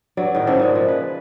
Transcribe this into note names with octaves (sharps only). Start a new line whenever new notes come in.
G2 F#3 D5
A2 D#3
G#2 C#3 A#3 A4
A#2 G#3
F3
B4